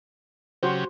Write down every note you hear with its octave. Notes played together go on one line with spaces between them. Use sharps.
C#3 F#3 F#4 G4 C5